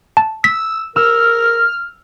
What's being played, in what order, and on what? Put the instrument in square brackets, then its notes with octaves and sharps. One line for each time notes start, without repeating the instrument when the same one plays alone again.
[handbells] A5
[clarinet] E6 [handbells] B6
[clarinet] A#4 [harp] E6 [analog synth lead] F6